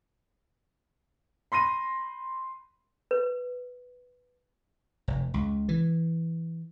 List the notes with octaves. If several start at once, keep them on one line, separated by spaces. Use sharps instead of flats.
B5 C6 A#6 D#7
B4
F1
C#2
E3